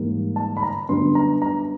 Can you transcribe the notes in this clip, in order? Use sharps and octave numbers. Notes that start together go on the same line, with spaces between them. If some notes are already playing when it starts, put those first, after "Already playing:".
Already playing: G#2 E3 G3 A#3
A5
B5
A#5
F#2 D3 G3 B3 D4 C6
A#5
A#5